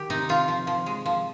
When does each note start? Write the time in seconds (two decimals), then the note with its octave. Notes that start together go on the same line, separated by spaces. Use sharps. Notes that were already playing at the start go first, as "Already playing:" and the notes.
Already playing: D#3 G4
0.10 C3 D#4
0.29 C3 F4
0.48 F3
0.67 F3
0.86 G#3
1.06 F3